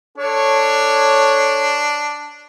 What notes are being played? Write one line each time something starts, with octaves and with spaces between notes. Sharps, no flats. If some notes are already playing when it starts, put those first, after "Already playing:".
D4 A4 C#5